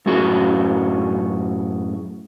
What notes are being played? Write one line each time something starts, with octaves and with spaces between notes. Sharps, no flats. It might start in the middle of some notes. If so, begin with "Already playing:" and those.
F#2 A2 C#4 F#4 G#4